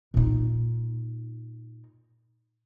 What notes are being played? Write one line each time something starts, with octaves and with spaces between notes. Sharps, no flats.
A#2 D#4